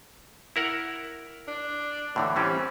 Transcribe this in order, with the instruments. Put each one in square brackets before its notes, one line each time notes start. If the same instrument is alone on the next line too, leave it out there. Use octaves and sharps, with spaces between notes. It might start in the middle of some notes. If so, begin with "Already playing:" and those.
[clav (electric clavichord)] E4 A#4 F#5
[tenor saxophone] D4
[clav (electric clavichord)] A2 D3 E3
[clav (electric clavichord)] E3 G3 C#4 [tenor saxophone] C4